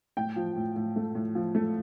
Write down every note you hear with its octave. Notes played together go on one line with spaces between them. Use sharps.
A2 G5
F3
A2
A2
A3
A2
F3
A3